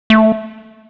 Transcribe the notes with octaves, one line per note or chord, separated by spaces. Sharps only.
A3